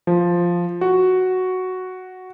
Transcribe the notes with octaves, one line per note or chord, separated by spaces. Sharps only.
F3
F#4